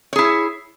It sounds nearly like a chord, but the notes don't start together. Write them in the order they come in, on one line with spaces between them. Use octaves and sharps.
C#5 G#4 E4